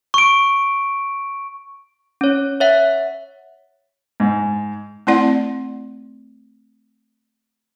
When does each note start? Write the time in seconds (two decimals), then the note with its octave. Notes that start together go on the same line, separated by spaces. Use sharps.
0.14 C#6 D7
2.21 C#4 C#5
2.60 C#5 E5 F#5
4.20 G#2
5.07 A3 C4 E4 D5 F#5